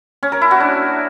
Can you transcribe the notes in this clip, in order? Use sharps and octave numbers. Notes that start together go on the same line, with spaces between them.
C#4
A#4
E4
F#4
D4